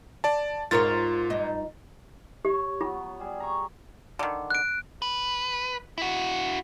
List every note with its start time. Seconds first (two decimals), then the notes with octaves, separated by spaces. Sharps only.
0.24 D5 A5
0.71 G#2 F4 A#4 C#5 A6
1.30 G2 D#4
2.45 G4 C#5
2.81 F#3 B3 F4
3.19 G3 G#4
3.40 A#5 C#6
4.19 D3 D#3
4.50 F#6 D7
5.02 B4
5.98 E4 F#4